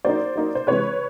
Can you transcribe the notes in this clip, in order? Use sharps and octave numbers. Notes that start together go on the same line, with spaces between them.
F#3 A#3 D#4 C5 D5
F#3 A#3 D#4
C5
C3 E3 G#3 B4 C#5